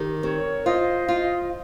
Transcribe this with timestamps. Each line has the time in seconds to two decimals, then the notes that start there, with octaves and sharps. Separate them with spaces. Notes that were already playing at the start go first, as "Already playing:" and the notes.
Already playing: D#3 G4
0.23 C4 A#4 C#5
0.66 F4 C5 D#5
1.08 F4